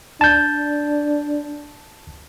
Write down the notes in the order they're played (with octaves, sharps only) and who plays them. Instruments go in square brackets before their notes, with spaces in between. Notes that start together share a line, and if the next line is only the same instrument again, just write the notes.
[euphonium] D4 [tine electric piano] A5 G6